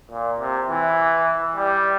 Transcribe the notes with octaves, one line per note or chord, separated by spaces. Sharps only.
A#2
C3
E3
G3